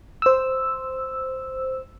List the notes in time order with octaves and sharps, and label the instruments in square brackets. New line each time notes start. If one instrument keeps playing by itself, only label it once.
[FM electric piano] C5 E6